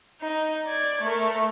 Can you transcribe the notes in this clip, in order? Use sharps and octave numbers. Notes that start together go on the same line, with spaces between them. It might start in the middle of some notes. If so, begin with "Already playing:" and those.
D#4
D5 G#6
A3 A#4